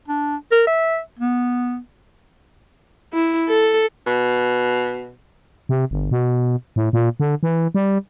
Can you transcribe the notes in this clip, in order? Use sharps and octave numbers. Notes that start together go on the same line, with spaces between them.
D4
A#4
E5
B3
E4
A4
B2
C3
G1
B2
A2
A#2
D3
E3
G3